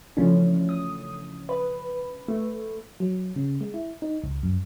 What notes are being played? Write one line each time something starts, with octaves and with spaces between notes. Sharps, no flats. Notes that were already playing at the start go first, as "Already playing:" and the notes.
C#3 E3 F3 A3 C#4 D4
D#6
B4
A3
F#3
C#3
G#3
E4
D#4
C#2
F#2